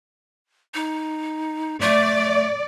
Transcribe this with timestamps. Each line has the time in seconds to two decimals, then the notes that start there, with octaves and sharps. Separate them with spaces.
0.74 D#4
1.81 A3 D5